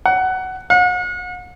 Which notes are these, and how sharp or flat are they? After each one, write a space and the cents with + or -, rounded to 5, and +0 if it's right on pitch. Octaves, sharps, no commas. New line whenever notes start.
F#5 +15
F#5 -40